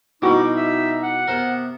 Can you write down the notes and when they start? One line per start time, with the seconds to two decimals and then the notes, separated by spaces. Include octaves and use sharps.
0.22 B2 G3 D#4 E4 F#4 D6
0.56 E5
1.03 F#5
1.28 C3 B3 A#4 C5